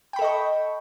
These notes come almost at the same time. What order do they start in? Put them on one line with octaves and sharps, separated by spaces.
G5 B5 A4 D#5 C#6